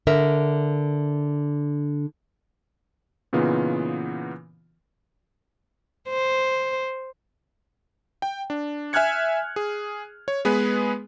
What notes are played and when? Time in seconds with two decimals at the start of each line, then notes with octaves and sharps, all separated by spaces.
0.07 D3 A#4 E5
3.33 A#2 C#3 E3 B3 D#4 F4
6.09 C5
8.22 G5
8.50 D4
8.93 E5 G#5 F6 F#6 G#6 C#7
9.56 G#4
10.28 C#5
10.45 G#3 B3 G#4 B4